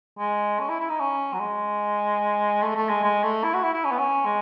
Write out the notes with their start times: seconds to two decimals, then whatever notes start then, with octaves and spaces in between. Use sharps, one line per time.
0.18 G#3
0.60 C#4
0.69 E4
0.80 E4
0.90 D#4
1.00 C#4
1.33 F#3
1.40 G#3
2.63 A3
2.76 A3
2.89 G#3
3.03 G#3
3.24 A3
3.44 E4
3.54 F#4
3.64 E4
3.74 E4
3.85 C#4
3.92 B3
3.99 C#4
4.26 G#3